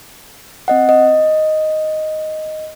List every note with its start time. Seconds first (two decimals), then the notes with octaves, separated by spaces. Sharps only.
0.68 C4 D#5 F#5
0.89 D#5